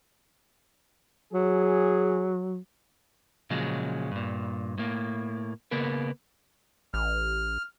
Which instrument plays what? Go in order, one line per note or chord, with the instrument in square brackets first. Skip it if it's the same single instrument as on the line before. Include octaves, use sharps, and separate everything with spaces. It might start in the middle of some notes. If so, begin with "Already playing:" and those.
[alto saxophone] F#3 [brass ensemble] G#4
[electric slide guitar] A#2 C#3 F3 F#3 G#3
G2 A#2
A2 A#3
C#3 A#3 B3 A#4
[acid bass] A1 [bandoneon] F6